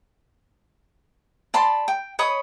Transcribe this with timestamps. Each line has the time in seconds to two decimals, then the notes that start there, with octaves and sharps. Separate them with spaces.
1.54 D5 A5 B5 C6
1.88 G5
2.19 C#5 D#5 B5 D#6